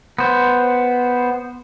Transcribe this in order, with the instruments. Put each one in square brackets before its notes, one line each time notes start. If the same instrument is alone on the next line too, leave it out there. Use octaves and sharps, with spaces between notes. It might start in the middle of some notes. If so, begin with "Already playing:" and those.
[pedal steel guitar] B3 C5